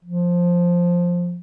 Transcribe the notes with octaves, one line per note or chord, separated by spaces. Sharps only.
F3